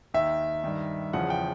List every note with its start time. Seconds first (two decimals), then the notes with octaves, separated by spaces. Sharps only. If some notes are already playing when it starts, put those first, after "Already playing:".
0.14 D#2 D#3 E5
0.64 G2 D#3
1.13 E2 C#3 F3 F#5
1.30 G5